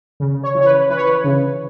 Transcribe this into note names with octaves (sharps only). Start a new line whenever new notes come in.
C#3
C#5
E3
C#5
B4
E3 B4
C#5
B4
C#3